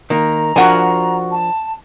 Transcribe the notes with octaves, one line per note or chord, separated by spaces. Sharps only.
D#3 A#3 A#5
F3 D4 F#4 A#4 F#5 G#5
A5